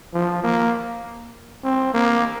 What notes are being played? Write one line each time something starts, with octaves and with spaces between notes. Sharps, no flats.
F3
A#3
C4
A#3